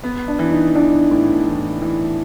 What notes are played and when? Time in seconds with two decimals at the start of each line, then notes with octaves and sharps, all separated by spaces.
0.04 B3
0.28 D4
0.39 E3
0.51 D#4
0.75 E3 D4
1.11 A2
1.47 E3
1.82 E3